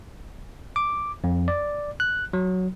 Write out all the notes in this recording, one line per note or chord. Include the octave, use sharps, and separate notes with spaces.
D6
F2
D5
F#6
F#3